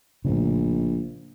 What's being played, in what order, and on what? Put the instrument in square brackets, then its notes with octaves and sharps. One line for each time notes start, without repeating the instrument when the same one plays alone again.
[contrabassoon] A#1 [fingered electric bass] A2 C#3